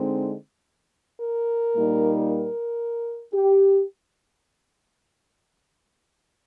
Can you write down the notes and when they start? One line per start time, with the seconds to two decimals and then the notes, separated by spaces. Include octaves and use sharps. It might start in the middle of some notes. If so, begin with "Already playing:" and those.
Already playing: D3 G#3 C4 D#4
1.20 A#4
1.73 A#2 G3 A#3 D#4
2.27 A#4
3.34 G4